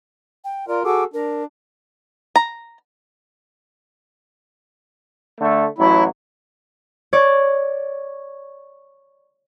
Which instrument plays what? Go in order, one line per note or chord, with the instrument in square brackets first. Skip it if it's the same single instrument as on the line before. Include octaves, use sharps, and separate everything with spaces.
[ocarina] G5
[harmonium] F4 A#4 [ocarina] D5
[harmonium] F#4 G#4 A4 [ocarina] D6
[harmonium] D4 [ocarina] A#4
[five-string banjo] A#5
[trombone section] D3 A3
[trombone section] A1 F#3 [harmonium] E4
[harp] C#5 D5